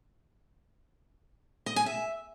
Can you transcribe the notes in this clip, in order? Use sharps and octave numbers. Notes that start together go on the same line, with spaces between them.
D#5
G#5
E5